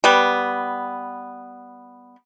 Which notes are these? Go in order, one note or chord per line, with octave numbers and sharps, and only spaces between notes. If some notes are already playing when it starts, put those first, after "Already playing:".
G3 B3